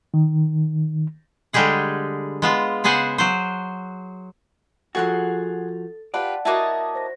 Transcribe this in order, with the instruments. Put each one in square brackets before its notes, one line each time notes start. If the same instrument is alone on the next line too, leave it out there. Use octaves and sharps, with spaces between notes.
[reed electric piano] D#3
[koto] D3 G3 G#3 G4 G#4 F#5
G#3 B3 F4
C#3 B3 G#4 C5 F#5 G#5
F#3 C5
[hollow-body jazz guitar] F3 F#4 [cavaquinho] G#4 F#5 C6 [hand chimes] A4 A6
[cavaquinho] F4 G4 B4 [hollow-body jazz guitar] D5 [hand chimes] F#5 A5
[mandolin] A#3 D#5 A5 [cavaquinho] E4 F#4 C#5 [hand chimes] E5
[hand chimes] C5 A#6